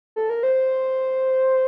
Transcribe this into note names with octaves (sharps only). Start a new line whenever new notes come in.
A4
A#4
C5